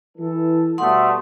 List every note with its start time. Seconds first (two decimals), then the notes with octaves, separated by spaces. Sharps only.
0.17 E3 A4
0.78 B2 G3 A3 F#5 C6 D#6